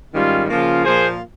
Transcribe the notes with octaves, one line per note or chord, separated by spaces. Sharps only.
G#2 D#3 G3 C#4 F4
C#3 F3 A#3 C#4 F4
A#2 F3 A#3 F4 G#4 C5